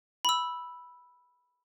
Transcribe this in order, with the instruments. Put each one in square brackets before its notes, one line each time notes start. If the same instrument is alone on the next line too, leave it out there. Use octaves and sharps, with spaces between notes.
[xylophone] B5 E6